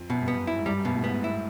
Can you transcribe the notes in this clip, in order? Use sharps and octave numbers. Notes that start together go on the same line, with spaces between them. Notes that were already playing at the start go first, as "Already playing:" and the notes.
Already playing: F2
F#2 B2
G2
B3
F#2
E4
G#2
G2 G3
F#2
G2 B2
A2
G#2 B3
A2 E4